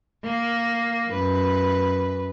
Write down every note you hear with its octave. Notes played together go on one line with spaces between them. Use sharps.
A#3
F#2 B4